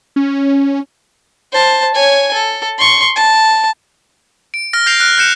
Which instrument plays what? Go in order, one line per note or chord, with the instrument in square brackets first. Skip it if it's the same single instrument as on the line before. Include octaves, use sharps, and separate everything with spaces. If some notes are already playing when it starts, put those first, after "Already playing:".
[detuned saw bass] C#4
[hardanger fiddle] C5 A5
C#5 G#5
A4
C6 C#6
A5
[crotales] D7
F6 A#6
G6 A#6 C7 F7
F6 F#6
F#6 G6 C#7 E7